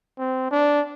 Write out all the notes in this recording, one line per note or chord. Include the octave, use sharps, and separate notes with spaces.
C4
D4